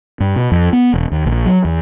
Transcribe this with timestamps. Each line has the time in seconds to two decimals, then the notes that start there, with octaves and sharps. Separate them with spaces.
0.20 G2
0.36 B2
0.52 F2
0.73 B3
0.94 E1
1.11 D#2
1.26 A#1
1.46 F#3
1.65 E2